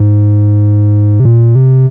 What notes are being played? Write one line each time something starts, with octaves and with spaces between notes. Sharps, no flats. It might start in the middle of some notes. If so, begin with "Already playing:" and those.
Already playing: G#2
C3
A#2
C3